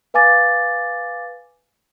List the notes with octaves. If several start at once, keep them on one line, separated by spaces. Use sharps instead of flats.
B4 F5 G#5 D6 A6